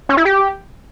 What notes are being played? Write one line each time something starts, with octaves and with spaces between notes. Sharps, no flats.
C#4
E4
G4